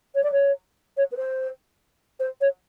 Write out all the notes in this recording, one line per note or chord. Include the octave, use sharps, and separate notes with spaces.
C#5
D5
C#5
C#5
B4
C5
C5
C#5